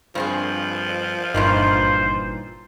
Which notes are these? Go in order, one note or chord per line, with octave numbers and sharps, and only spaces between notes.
G2 F3 C4 G#4
G1 G2 A#2 E3 D#4 C5